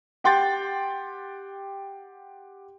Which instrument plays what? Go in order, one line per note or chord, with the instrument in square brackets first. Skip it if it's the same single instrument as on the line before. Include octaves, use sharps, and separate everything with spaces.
[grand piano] G4 F#5 G5 C6 G6 A6